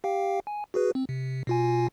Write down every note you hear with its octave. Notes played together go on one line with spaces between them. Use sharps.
G4 F5 G5
G#5
F#4 G#4 B4
C4
C3
B2 F4 G#5